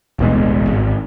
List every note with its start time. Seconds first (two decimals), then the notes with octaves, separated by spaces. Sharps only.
0.19 D1 A1 B2 G#3
0.67 G#1